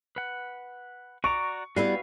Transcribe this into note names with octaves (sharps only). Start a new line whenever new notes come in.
B4 F#5
F#4 D5 A#5 C#6
G3 B3 E4 F#4 B4 F5